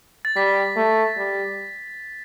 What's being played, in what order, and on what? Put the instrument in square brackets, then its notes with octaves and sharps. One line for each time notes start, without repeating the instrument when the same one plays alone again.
[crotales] A6
[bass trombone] G3 [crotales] B6
[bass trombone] A3
G3